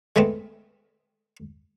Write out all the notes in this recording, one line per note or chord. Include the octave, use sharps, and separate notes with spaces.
G#3 A3 B3 C4